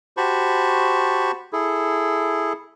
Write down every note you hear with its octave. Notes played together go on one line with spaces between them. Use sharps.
F#4 G4 C5 A5 B5 C#6
E4 G#4 A4